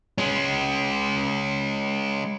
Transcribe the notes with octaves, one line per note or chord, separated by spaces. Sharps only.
G#3 C#4